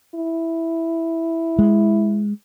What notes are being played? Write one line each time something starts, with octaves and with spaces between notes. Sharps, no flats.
E4
G#3